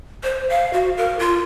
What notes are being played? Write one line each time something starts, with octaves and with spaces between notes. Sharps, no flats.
C5
F5
F#4
A#4
F4